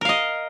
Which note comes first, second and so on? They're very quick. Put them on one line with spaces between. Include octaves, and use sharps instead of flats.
A#4 F5 D#5